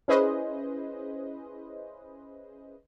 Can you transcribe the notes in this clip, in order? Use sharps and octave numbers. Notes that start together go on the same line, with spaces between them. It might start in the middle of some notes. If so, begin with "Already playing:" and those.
C#4 E4 G#4 B4 C5 D#5